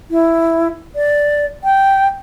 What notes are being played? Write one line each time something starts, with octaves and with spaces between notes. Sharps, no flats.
E4
D5
G5